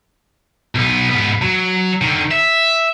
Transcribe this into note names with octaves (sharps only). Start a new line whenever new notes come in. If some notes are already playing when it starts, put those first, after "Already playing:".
B1 B3
G#2 B3
F#3
D3 D#3
E5